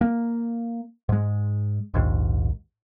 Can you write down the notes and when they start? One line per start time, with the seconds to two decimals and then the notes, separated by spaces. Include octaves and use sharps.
0.01 A#3
1.09 G#2 G#3
1.94 A#1 D#2 G#2